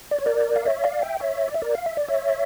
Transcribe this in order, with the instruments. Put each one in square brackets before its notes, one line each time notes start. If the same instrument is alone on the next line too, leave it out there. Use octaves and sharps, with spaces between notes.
[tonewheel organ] D5
C#5
A#4 D5
F5
C#5 E5
D5 F5
E5 G5
C#5 E5
D5
E5
A#4 D5
F5
E5
D5
C#5 E5